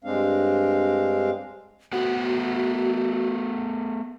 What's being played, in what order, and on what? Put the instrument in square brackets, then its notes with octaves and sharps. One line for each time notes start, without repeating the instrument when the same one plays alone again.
[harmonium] G2 G#3 C4 D4 F5
[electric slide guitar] A3 B3 F#5 [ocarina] F#4